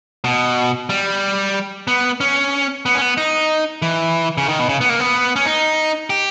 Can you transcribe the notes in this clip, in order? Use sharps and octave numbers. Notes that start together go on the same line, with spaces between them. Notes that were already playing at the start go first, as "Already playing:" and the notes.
B2
G3
B3
C#4
B3
C#4
B3
D#4
E3
C#3
D#3
B2
C#3
B3
A#3
B3
C#4
D#4
G4